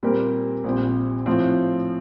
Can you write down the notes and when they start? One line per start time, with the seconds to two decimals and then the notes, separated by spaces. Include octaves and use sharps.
0.03 A#2 G3 C4 G4 A#4
0.64 A#1 A#2 G3 C4
1.26 A2 F3 C4 F4 C5